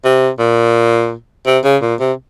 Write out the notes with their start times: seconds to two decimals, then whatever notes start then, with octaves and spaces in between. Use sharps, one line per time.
0.05 C3
0.39 A#2
1.47 C3
1.64 C#3
1.82 A#2
2.00 C3